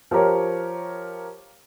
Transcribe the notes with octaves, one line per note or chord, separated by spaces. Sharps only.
F3 G4 A#4 C#5